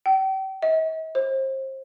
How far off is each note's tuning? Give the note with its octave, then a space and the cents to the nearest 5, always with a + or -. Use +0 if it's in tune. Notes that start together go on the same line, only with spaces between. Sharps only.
G5 -35
D#5 +45
C5 +30